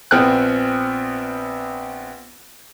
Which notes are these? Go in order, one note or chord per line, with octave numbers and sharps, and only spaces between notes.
A#1 B3 C4 G5 F6 F#6